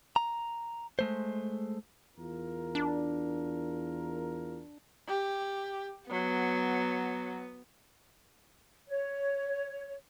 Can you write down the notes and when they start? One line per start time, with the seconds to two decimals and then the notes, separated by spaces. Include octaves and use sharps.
0.16 A#5
0.99 G#3 A3 C5
2.16 E2 F4 A#4
2.75 D4
5.08 G4
6.11 F#3 B3
8.89 C#5